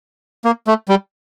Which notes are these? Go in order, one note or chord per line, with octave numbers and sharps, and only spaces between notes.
A#3
A3
G3